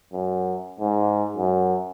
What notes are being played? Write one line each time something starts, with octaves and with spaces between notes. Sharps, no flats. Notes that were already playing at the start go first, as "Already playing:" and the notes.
F#2
G#2
F#2